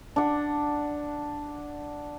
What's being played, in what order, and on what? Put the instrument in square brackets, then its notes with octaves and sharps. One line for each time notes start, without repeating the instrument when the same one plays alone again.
[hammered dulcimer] D4 F#5